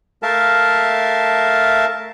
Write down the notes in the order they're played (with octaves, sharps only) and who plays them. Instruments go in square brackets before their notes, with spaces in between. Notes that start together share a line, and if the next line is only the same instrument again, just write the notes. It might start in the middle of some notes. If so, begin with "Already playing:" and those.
[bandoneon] A3 A#4 E5 F5 A5